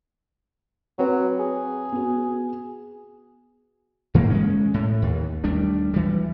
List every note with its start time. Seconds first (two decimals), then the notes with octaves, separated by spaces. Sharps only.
0.99 F#3 C4 B4
1.40 G#4
1.92 B3 F#4
4.14 G#2 E3 A#3
4.30 G#3 A#3 C#4
4.74 A2
5.02 D#2
5.44 D#2 G3 A3 D4
5.94 E3 G3